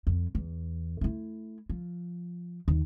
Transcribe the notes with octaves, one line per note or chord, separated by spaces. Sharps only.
F2
E2
A3 E4
F3
D#2